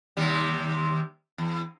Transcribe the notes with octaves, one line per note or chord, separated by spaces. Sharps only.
D#2 C3 G3
E2